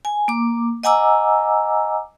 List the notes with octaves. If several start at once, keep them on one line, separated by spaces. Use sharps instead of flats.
G#5
A#3 D6
D#5 F#5 G#5 A#5 D6 E6